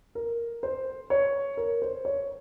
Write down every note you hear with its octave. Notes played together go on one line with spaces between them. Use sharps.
A#4
C5
C#5
A#4
C5
C#5